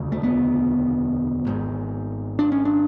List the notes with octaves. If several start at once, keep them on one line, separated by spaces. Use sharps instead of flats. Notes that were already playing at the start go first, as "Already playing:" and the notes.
Already playing: E1 D2 C#3
A3
B3
G#1 G#2
D4
C#4
D4